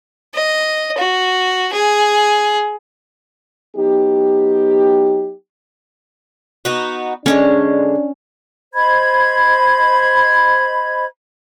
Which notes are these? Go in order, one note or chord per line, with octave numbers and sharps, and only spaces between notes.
D#5
F#4
G#4
F#3 B3 D#4 G4
B3 D#4 F#4
D3 F3 G#3 C#4 D4
C5 D#5 B5 G#6